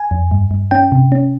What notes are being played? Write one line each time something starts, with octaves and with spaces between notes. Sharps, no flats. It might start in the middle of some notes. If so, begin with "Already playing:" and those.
Already playing: G#5
F2
G2
G2
C#4 G5
C3
C#4